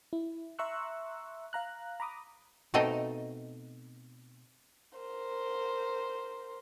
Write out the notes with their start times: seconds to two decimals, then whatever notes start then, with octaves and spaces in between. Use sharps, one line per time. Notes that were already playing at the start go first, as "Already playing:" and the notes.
0.13 E4
0.59 E5 A#5 C6 C#6 E6 F#6
1.53 F5 A#5 F#6
2.00 A#5 B5 D6 D#6
2.74 B2 A3 C4 D#4 D#5
4.98 A#4 C5